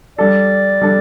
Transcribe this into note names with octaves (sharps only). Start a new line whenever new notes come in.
G3 D4 A4 D5
G3 D4 A4